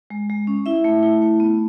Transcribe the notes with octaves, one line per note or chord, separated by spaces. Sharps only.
G#3
G#3
C#4
E4 E5
A3
E4
A3
B3